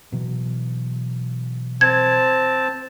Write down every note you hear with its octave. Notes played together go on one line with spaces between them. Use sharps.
B2 E3 F#3
C4 A5 G#6